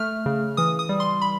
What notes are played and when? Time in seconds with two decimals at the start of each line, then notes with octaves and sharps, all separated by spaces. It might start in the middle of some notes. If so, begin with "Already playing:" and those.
Already playing: A3 F6
0.26 C#3
0.57 E3 D#6
0.79 D#6
0.89 G3
1.00 C6
1.21 B5